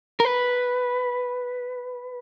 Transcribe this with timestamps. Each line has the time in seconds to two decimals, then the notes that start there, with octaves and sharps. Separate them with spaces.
0.20 A#4
0.25 B4